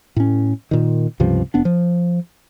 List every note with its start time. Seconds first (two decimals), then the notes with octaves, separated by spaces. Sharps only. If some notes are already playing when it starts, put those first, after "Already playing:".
0.16 A2 C#4
0.71 A#2 D#3
1.20 C#2 G2 C3 F3
1.54 F1 B3 D4
1.65 F3